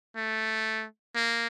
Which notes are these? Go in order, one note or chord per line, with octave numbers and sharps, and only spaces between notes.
A3
A#3